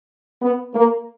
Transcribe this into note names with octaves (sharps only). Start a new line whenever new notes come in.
B3
A#3